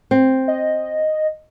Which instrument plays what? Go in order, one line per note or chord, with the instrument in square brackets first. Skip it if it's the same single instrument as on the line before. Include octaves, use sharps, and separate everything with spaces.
[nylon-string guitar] C4
[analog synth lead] D#5